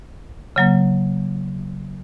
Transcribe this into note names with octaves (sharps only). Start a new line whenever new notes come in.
C#3 F#3 A#3